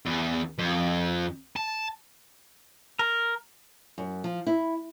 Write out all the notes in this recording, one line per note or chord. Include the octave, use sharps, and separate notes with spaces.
E2
F2
A5
A#4
F#2
F3
E4